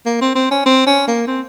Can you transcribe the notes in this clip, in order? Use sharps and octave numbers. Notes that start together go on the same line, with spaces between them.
A#3
C4
C4
C#4
C4
C#4
A#3
C4